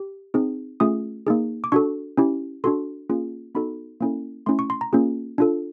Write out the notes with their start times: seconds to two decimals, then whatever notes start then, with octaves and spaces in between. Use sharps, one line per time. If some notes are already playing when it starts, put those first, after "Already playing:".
Already playing: G4
0.34 C4 D#4 G#4
0.80 A3 C#4 F4 G#4 D#6
1.27 A#3 D#4 G#4
1.64 D6
1.72 D4 F#4 A4 C#6
2.17 C#4 E4 G4
2.64 D4 F#4 A4 C6
3.09 A#3 C#4 F4 G#4
3.55 B3 D#4 F#4 A4 B5
4.01 A#3 C#4 E4 A4
4.46 A3 C#4 E4 C6
4.59 C#6
4.70 C6
4.81 A#5
4.93 A#3 C#4 F4 G#4
5.38 D4 F4 A4